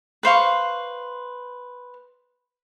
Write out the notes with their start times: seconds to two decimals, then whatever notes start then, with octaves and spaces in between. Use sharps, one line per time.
0.23 B4 C5 F5 C#6